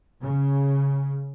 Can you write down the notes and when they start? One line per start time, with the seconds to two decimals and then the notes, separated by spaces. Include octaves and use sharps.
0.21 C#3